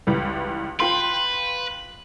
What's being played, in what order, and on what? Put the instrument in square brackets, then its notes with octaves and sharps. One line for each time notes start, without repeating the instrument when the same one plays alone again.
[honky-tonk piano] C#2 E3 G3
[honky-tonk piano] F4 G5 C6 [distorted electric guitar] B4